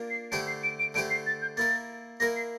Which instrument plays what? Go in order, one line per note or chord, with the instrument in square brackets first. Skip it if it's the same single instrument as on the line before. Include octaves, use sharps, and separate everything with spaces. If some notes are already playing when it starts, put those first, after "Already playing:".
Already playing: [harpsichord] A#3 D4 F4 A#4
[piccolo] C7
[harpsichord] D3 A3 E4 G4 C5 [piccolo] D7
[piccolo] C7
D7
D7
[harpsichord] D3 A3 E4 G4 C5 [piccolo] D7
[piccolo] C7
A6
G6
[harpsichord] A#3 E4 A#4 [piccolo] A6
[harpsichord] A#3 E4 A#4 [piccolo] A#6
[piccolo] C7